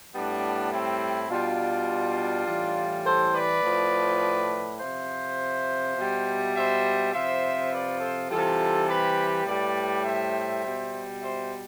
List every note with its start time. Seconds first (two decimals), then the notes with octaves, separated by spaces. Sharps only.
0.13 G3 B3 D4
0.19 A2
0.72 C4 E4
1.30 B2 G3 D4 F4
2.47 A2 E3 G3
3.05 A4 C5
3.34 B4 D5
3.63 A2 F3
4.80 C3 F3 C5 E5
5.97 B2 G3
6.56 C5 E5
7.13 C3 F3 C5 E5
7.72 B4 D5
8.00 A4 C5
8.29 C3 E3 G3 F4 A4
8.88 G4 B4
9.46 A2 G3 B4 D5
10.04 C5 E5
10.63 B2 G3
11.21 C5 E5